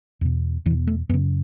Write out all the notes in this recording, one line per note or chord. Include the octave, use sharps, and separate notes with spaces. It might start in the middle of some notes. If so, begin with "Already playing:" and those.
E2 B2
E2 B2 E3
A3
F#2 C#3 B3